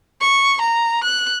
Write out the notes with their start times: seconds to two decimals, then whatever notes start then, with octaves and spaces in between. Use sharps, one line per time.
0.21 C#6
0.61 A#5
1.04 F#6